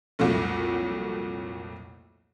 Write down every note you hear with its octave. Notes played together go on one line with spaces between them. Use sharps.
C2 F2 A#2 F#3 A3